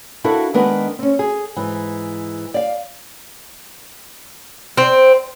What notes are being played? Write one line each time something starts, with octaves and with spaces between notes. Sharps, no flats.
D4 E4 F#4 A4 A#4 F5
D#3 G#3 B3 D4 A#4 B4
C4 C#4
G#4
G#2 E3
D5 F5
C4